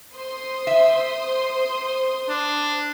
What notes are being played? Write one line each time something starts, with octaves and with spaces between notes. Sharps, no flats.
C5 C6 D#6
E5
D4